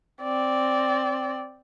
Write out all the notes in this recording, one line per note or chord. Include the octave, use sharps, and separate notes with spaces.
C4 D5